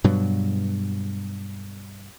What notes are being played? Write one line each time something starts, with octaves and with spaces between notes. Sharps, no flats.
G2 B2 F#3